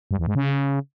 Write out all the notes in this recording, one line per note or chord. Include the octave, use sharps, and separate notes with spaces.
G2
E2
G#2
C#3